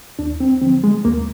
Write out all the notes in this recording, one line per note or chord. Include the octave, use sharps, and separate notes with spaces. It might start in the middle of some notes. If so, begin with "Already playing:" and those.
D#2 D4
C4
D3 F3 C4
G#3
D#2 A#3